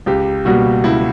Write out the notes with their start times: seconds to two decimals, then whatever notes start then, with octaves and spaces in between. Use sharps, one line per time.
0.06 C#2 G4
0.45 B2 G3 A#3 F#4
0.84 C#2 E4